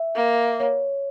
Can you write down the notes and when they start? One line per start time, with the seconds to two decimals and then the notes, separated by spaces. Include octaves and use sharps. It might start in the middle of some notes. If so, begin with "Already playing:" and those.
Already playing: E5
0.16 A#3
0.60 C#5